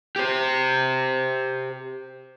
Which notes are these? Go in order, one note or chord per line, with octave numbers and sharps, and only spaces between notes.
G4 C5